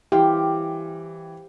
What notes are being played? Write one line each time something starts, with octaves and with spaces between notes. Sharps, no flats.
E3 G4 C5 F5 G5